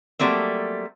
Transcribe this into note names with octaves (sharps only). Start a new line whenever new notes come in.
F#3 G3 A3 A#3 C4